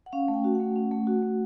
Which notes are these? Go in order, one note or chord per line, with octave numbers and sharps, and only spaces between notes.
F#5
C#4 F5
A3
G5
F#4
F#5
A3
C#4
A3
F#4
A3